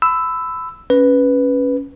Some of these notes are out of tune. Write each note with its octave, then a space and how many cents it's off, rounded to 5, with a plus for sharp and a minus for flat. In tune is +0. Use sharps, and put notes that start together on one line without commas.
B5 +30 E6 +0
C#4 +0 B4 +0